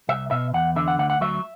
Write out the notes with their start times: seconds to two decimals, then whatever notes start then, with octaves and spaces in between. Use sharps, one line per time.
0.09 C2 E5
0.31 B2 E5
0.54 E2 F#5
0.76 D3 E5
0.88 F#5
0.99 D2 F#5
1.10 F#5
1.21 F#3 E5